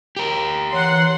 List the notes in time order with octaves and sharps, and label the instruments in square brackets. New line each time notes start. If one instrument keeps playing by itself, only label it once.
[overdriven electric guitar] G4 A#4
[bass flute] E3 [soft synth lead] C#5 [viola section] F#5 C6